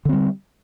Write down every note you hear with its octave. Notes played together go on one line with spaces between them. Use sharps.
D3 G3 C4